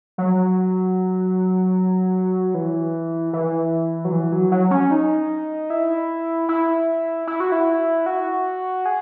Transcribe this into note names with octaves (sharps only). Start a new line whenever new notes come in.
F#3
E3
E3
F#3
E3
F#3
F#3
C#4
D#4
E4
E4
E4
F#4
E4
F#4
G#4